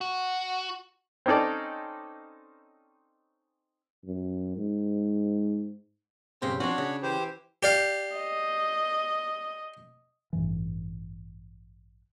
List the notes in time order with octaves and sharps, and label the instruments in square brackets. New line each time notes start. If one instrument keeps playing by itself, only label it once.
[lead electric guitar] F#4
[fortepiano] C4 C#4 D#4 A4 D5
[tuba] F#2
G#2
[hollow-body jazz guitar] B1 G2 C#3 [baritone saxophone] C4
[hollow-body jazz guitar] F3 C4 [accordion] D4 C#5 [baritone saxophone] F#4
[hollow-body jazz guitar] C#3
[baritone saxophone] E3 [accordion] G4 C5
[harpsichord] G4 D5 F5
[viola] D#5
[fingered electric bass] A1 G2 E3